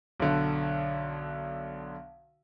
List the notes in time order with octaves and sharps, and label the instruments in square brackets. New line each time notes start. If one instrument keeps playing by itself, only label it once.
[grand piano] B1 D3